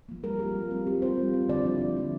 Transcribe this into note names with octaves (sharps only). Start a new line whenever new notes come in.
F3 A#3
G3 A#4
C4 F4 G4
G3
C4 F4
G3 G4
C4 F4 C5
G3
C4 F4
D3 D5
F3 A#3 E4
D3
F3 A#3 E4